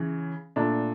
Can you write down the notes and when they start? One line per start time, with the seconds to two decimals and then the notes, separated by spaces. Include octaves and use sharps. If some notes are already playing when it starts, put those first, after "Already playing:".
Already playing: C#3 E3
0.56 A#2 A3 D4